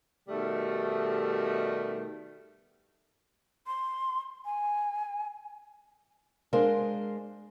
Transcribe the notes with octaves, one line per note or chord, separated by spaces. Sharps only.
B2 D#3 G3 A3
C6
G#5
G#3 D4 A#4 C5 D#5 F5